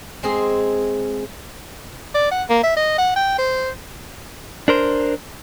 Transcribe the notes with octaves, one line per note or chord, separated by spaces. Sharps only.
G#3 C4 G#4 C6
D5
F#5
A#3
E5
D#5
F#5
G5
C5
D4 A#4 C5